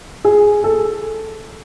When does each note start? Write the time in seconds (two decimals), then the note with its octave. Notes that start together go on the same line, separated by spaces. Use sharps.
0.25 G#4
0.64 A4